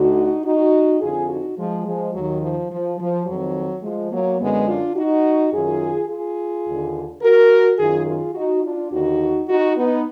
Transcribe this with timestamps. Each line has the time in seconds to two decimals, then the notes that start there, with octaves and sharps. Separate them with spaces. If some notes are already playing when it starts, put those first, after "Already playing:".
Already playing: D2 D3 D#4 F#4
0.44 D#4 F#4
1.00 F2 D3 F4 G#4
1.28 D#4 F#4
1.56 F3 G#3
1.85 F3 G#3
2.13 D#2 D#3 F#3
2.41 F3
2.71 F3
2.98 F3
3.26 F2 D#3 F#3
3.83 F3 G#3
4.11 F#3 A#3
4.39 F#2 D3 G#3 B3
4.67 D4 F4
4.95 D#4 F#4
5.52 F#2 D#3 F4 G#4
6.09 F4 G#4
6.65 D#2 D3
7.22 F#4 A#4
7.78 F#2 D#3 F4 G#4
8.06 F4 G#4
8.34 D#4 F#4
8.63 D4 F4
8.91 D#2 D3 D#4 F#4
9.48 D#4 F#4
9.76 B3 D#4